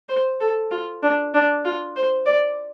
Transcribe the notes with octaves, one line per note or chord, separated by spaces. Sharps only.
C5
A4
F4
D4
D4
F4
C5
D5